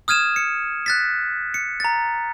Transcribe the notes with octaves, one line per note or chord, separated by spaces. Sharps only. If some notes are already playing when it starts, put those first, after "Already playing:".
D#6 F6 G#6 D#7 E7
C#7
F#6 A6 B6
C#7
A#5 A6